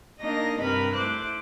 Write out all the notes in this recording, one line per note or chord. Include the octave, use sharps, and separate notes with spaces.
A#3 D4 D#4 D#5 A#6
G2 C3 A#4 B4 B5
A3 E4 C5 D6 F#6